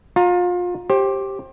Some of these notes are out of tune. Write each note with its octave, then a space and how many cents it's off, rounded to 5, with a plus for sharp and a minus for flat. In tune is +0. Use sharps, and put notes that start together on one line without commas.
F4 +30 A#5 +0
G4 +0 C5 +30